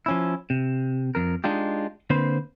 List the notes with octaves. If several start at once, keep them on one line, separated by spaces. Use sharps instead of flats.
F3 C#4 E4
C3
F2 A#4
G#3 D4 D#4 F4 G4
D3 A#3 C4 B4 C5